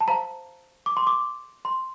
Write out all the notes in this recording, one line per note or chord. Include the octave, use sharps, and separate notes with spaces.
A5
C5 F5 A#5
D6
C6
D6
C6